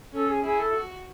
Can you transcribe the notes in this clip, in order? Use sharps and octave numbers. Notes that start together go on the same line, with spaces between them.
C#4 A4
G#4
E4 G#4
A4
F#4